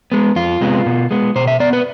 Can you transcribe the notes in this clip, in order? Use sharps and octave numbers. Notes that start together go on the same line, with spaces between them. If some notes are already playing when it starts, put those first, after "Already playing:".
G#3 B3
F2 F4
C3 G#3 B3
B2
G#3 B3
B2 C5
E5
B3 D5
B4